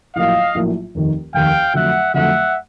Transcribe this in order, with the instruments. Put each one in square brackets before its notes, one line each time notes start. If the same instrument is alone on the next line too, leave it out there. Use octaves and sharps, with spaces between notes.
[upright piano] A#1 A2 F#3 A#3 [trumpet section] D#5 F5
[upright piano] A#1 A2 F#3 A#3
F1 D#2 D#3
[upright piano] F1 D#2 D#3 [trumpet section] F5 G5
[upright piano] F2 D3 F#3 A3 [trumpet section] E5 F#5
[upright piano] F2 D3 F#3 A3 [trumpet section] E5 F#5